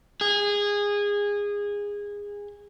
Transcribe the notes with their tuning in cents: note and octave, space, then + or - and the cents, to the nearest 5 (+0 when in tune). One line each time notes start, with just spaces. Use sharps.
G#4 -20